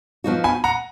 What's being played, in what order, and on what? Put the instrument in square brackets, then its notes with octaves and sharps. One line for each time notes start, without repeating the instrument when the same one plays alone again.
[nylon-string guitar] F3 B3 D#4 F#4
[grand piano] G#5 B5
F#5 A#5